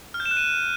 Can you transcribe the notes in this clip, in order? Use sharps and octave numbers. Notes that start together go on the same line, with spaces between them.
F6
G6
E7
F#6
D#7